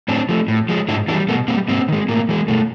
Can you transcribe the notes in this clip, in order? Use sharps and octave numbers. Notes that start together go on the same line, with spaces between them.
A2 C4 D4
F3 A3
A2
F3 G#3
G#2 D4 E4
E3 G3 D4 E4
B2 A3 B3
G3 A#3 C4
G#2 A#3 C4
D#3 G#3
A2 A#3
E3 G#3
B2 A3